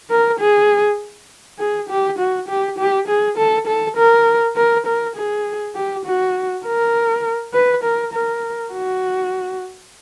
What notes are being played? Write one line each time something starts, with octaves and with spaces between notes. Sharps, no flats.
A#4
G#4
G#4
G4
F#4
G4
G4
G#4
A4
A4
A#4
A#4
A#4
G#4
G4
F#4
A#4
B4
A#4
A#4
F#4